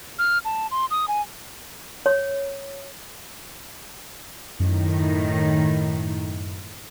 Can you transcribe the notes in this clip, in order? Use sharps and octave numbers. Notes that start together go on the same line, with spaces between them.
F6
A5
C6
D#6
G#5
C#5
F#2 A2 D#3